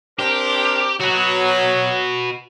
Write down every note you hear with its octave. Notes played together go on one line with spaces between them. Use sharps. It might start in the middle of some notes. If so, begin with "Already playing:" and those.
C4 D4 G4 A#4
F#3 F#4 B4